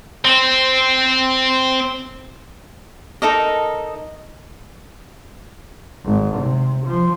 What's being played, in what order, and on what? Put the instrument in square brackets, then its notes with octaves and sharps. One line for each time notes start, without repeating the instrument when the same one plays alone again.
[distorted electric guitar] C4 C5
[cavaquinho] D#4 A4 A#4 D#5
[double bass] G#1
C3
F3